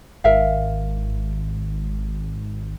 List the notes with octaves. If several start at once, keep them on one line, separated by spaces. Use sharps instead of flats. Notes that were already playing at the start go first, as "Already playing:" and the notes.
G#1 A#4 E5 F5